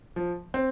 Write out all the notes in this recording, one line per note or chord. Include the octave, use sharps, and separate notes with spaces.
F3
C4